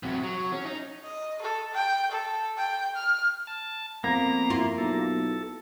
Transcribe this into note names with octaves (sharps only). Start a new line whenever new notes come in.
C3 F#3
F#3
C#4
D#4
D#5
A4
G5
A4
G5
F6
A5
F2 A#3 B3 A#5
E4 F4
B1 A4